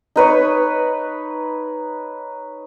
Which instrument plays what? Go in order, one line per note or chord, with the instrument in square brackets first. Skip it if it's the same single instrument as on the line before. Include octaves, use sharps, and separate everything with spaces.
[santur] D#4 B4 C#5